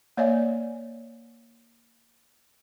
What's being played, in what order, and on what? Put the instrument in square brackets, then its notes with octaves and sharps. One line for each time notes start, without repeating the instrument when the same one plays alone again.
[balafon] A#3 C#5 D5 E5 G#5